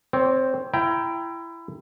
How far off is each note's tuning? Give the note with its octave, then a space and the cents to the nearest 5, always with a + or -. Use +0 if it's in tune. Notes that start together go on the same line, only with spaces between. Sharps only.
C4 +0 C#5 +35
E4 +25 G5 +0 A#5 +20